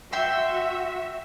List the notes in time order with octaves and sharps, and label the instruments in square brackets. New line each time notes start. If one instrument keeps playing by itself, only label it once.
[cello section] F#4 E5 [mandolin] G5 C6